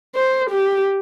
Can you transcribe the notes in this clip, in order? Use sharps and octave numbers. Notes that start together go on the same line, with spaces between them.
C5
G4